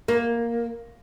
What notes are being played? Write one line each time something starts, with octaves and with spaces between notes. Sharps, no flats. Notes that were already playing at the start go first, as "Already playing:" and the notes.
A#3